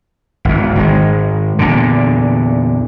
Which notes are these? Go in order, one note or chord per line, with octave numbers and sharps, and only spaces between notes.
G#1 E2
G#2 D#3 G#3
E2 A#2 D3